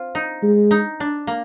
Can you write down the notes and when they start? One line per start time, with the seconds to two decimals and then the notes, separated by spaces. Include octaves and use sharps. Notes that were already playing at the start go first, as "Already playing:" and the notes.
Already playing: C4 F4
0.15 D#4
0.42 G#3
0.71 D#4
1.00 D4
1.27 A#3